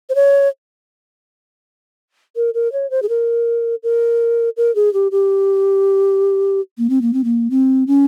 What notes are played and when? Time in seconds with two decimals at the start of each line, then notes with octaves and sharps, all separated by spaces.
0.09 C5
0.15 C#5
2.36 A#4
2.54 A#4
2.72 C#5
2.90 C5
3.02 G#4
3.09 A#4
3.83 A#4
4.57 A#4
4.75 G#4
4.94 G4
5.12 G4
6.78 A#3
6.90 C4
7.02 A#3
7.13 C4
7.24 A#3
7.51 C4
7.87 C#4